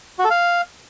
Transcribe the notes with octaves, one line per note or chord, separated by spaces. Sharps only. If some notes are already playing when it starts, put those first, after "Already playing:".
F#4
A4
F5